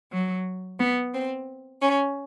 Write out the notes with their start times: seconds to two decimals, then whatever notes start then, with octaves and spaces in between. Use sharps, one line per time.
0.12 F#3
0.79 B3
1.13 C4
1.81 C#4